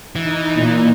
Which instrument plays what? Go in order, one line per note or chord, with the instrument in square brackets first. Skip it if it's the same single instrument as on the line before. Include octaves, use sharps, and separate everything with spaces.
[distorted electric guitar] E3 [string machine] D#4
[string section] A#2